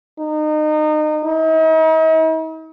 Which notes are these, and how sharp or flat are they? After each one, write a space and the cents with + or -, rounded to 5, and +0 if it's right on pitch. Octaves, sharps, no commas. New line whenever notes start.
D#4 -30
D#4 +45